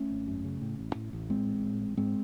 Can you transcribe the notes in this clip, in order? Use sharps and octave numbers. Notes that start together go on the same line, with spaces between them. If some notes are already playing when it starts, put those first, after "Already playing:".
Already playing: A3 C#4
G#1
F#2
C#3
A2
A1
A2
A1
A2 G#3 C4
A1
A2
A1
G#2 G#3 C4